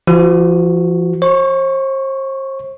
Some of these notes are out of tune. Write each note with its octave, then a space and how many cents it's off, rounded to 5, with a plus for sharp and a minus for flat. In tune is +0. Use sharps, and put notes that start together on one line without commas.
F3 -35 F#4 +0
C5 +40 C#6 +0